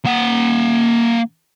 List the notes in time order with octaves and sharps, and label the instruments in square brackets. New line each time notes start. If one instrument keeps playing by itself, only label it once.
[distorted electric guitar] A#3 F#5